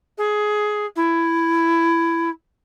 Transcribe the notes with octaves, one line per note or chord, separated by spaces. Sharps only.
G#4
E4